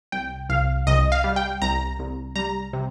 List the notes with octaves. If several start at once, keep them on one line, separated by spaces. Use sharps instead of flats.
C2 G5
C2 F5
C2 D#5
F5
G3
G5
C2 A#5
C2
G3 A#5
C3